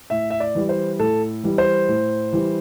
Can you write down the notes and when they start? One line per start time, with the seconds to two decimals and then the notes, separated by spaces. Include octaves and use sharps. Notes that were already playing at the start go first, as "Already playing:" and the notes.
0.10 A2 E5
0.30 E5
0.40 D5
0.55 E3 G3
0.69 C5
0.99 A2 A4
1.44 E3 G3
1.58 C5
1.88 A2
2.33 E3 G3